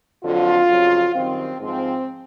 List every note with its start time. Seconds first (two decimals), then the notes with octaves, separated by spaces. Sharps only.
0.24 F2 D3 F#3 F4
0.70 F2 C#3 F#3
1.15 F#2 D#3 G3 C4
1.60 G#2 F3 C4